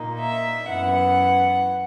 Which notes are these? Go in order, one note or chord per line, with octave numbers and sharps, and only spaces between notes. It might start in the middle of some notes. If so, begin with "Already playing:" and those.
Already playing: A#2 A#3 D#4
E5
F#2 E3 B3 F#5